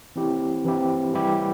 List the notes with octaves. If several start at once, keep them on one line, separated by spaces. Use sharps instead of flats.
E3 C4 E4 G4
E3 C4 E4 G4
E3 G3 E4 G4